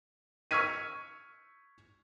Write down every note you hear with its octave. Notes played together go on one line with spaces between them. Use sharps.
C#6 E6 F6 G#6 B6 D#7